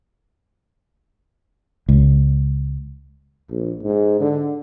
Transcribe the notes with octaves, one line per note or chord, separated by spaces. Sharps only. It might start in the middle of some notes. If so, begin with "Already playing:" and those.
C#2
A#1
G#2
D3